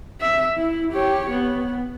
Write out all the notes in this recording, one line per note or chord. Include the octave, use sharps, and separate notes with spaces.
E5
E4
G4 C#5
B3